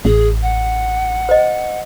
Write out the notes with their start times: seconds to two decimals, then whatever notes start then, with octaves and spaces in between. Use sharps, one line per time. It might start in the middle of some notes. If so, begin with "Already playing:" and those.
0.05 A1 G#4
0.42 F#5
1.29 C5 D#5